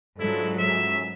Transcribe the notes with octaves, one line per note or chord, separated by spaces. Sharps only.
G#2 F#3 G#3 D4 E4 F4 A4
C#2 F#2 E5